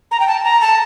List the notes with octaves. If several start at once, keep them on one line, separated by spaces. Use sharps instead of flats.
A#5
G5
A5
A#5
A5